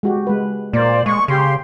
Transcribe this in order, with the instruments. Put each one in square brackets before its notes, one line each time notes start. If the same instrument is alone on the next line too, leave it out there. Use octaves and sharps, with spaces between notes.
[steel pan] G#3 F#4 G4
G#3 B4
[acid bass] A#2 [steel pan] A#3 [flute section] C5 D5
[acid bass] G#3 [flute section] C#6
[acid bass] C#3 [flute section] G4 C6